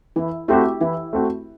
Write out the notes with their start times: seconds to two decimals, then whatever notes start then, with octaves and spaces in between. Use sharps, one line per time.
0.16 E3 E4
0.48 A3 C4 E4 F#4 G4
0.81 E3 E4
1.13 A3 C4 F#4